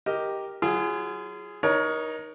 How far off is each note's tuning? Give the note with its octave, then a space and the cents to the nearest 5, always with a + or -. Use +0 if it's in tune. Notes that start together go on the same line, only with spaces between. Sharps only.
G4 +0 A#4 +0 D#5 +10
F#3 +0 F4 -35 G#4 +0
D#4 +0 A#4 +35 C#5 +15